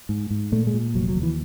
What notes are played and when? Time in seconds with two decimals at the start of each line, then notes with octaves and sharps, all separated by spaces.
0.09 G#2
0.31 G#2
0.52 A#2 A3
0.67 G#3
0.73 A#2
0.95 F1 F#3
1.09 F#3
1.16 D#2
1.23 E3